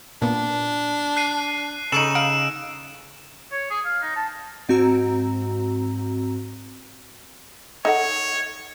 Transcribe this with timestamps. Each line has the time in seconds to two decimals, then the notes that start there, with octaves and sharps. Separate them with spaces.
0.22 A#2 B3 D4
1.17 F#6 C7 D#7
1.92 C#3 D#4 A4 C#6 E6 D7 E7 F#7
2.15 F5 D#6 D7
3.52 C#5
3.70 G#4
3.85 F5
4.02 D#4
4.16 A5
4.69 G#2 C4 F#4 A#5 E6
7.85 D#4 A4 C#5 F#5